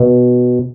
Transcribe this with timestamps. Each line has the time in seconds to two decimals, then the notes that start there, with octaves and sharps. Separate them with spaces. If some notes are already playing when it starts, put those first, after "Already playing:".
Already playing: B2